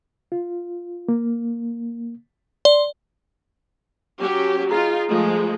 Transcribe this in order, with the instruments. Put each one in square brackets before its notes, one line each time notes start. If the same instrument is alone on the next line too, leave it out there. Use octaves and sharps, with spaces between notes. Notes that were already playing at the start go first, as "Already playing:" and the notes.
[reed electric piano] F4
A#3
[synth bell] D5 [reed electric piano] C6
[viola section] F#3 C#4 G4
[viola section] D#4 F4 [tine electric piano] G#4 A#5
[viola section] F3 G#3 A3